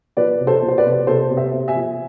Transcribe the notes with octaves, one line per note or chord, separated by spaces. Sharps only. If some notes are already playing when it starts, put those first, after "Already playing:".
F3 B4 D5
C3
A4 C5
F3
C5
B4 D5
C3
C3 A4 C5
C3
C5 E5
C3
E5 G#5
F3